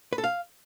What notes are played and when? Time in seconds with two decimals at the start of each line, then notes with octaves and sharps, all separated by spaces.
0.13 B4
0.18 A4
0.24 F5